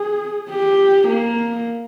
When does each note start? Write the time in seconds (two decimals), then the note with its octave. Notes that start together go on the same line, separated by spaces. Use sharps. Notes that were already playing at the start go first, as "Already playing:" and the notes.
Already playing: G#4
0.49 G4
1.08 A#3